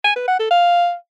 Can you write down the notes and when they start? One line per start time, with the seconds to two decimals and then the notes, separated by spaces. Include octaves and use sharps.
0.04 G#5
0.16 B4
0.27 F#5
0.39 A4
0.50 F5